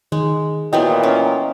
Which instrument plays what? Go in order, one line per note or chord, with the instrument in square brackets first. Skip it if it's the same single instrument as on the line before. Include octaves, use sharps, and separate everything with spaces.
[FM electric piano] D#3 [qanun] G#3
[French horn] A#2 [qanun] E3 F#3 B3 [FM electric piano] D#5 G5
[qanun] C#4